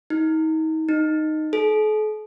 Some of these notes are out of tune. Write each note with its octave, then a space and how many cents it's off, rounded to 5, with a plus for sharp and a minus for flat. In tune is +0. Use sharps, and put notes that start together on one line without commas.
D#4 +35
D#4 -5
A4 -45